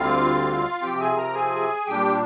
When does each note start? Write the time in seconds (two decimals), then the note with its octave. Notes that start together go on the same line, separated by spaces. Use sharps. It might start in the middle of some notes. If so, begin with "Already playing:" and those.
Already playing: D2 D3 G3 C4 F4 F5
0.82 C3 F3 C4 G4 G5
1.00 G#4 G#5
1.17 A#4 A#5
1.34 G#4 G#5
1.87 A#2 G3 D4 G4 G5